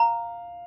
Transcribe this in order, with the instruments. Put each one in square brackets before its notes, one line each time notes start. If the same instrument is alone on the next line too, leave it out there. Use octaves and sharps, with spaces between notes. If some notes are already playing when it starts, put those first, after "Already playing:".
Already playing: [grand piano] F5 [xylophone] A#5